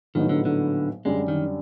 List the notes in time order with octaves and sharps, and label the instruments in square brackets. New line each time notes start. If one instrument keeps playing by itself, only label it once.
[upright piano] A#1 A2 F#3 B3 D#4 [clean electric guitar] D#3
[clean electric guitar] D3
D3
[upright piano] F#2 D3 G3 [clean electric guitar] G#3
[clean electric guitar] D#3